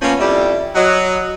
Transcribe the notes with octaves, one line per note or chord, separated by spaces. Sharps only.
F3 A#3 B3 C#4
F2 G3 E4 G4 D5 E5
F#3 D#5